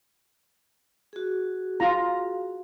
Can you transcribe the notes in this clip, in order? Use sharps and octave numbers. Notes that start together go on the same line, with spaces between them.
F#4 G#4
F4 A#5